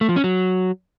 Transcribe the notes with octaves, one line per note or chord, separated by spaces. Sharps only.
A3
F3
C#4
F#3